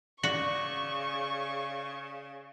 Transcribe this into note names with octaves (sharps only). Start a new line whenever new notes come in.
C#3 F#4 D5 C#6